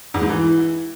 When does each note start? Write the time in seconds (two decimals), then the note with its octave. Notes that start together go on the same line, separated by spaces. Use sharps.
0.14 E2
0.22 G#2
0.29 E3